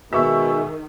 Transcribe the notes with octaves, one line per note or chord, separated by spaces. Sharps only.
B2 D#3 G#3 E5 C#6 E6